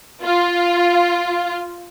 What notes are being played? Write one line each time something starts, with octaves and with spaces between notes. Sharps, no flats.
F4